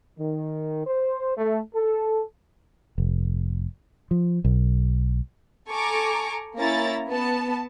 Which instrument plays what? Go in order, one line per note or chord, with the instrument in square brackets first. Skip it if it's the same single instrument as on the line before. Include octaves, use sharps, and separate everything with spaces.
[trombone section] D#3
C5
A3
A4
[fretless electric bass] F1
F3
B1
[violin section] A4 G#5 A#5 C#6 D6
A#3 C#4 E4 A#5 A6
B3 A5